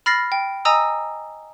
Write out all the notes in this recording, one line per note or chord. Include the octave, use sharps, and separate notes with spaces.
B5 F6 A6 A#6 C7
G5
D#5 G#5 A#5 D#6 E6